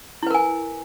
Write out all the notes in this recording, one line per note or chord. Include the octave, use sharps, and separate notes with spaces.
E4 A#4 B4 G#5